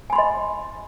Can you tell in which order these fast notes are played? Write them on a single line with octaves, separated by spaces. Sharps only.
G#5 B5 C6 D#5